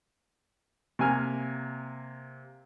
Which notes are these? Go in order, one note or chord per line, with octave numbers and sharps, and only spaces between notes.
C3 A#3 G#5 F6